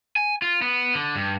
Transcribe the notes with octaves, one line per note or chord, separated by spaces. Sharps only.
G#5
F4
B3
D3
G2